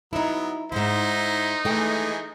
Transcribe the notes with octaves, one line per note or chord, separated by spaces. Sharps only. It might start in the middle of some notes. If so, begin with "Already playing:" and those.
F#3 B3 D#4 E4
D#2 G#2 D#4 E4 C5
E3 G#3 A3 G5